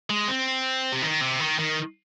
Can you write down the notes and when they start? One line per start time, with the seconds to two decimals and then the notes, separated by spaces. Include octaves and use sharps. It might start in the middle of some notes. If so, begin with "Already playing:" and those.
0.10 G#3
0.28 C4
0.92 C3
1.02 D#3
1.21 C3
1.40 D#3
1.59 D#3